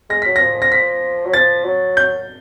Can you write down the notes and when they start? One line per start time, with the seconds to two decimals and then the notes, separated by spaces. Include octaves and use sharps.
0.10 G#3 A#6
0.22 F#3 B6
0.36 A#6
0.41 F3
0.62 A#6
0.72 B6
1.26 F#3
1.33 F3 A6
1.65 F#3
1.97 G6